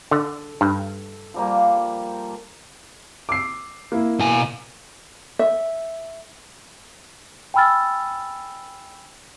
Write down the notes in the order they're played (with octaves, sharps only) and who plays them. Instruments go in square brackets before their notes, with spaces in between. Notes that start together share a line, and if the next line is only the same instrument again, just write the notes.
[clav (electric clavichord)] D3 [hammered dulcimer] A4
[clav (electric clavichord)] G2
[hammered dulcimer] F3 G3 A#3
[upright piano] D6 E6 C7
A#3 E4
[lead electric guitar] B2 G#5
[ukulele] E5
[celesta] G5 G#5 B5 E6 F6 A6